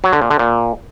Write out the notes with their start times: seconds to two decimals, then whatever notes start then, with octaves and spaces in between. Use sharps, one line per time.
0.04 F#3
0.13 D3
0.22 A#2
0.30 D3
0.39 A#2